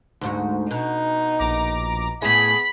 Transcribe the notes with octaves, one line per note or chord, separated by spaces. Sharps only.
D2 G#2 F#4
B2 D#4
A#1 A#5 D6
A2 B3 E4 G#4 B5